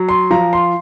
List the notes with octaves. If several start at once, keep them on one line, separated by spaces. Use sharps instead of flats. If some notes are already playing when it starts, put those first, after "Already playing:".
Already playing: F#3
C6
F3 A#5
C6